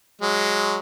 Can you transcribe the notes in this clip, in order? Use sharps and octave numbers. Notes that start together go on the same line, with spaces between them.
F#3 G#3